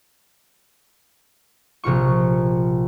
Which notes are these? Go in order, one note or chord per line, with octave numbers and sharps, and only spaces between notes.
A#1 C3 F4 C#6